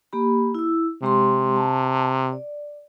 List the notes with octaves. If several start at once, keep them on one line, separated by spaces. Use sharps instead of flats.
A#3 G4 B5
E4 E6
C3 G#3 G4 C6
A5
D5